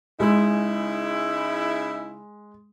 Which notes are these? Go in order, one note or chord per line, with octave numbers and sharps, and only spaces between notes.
C#3 G#3 D#4 E4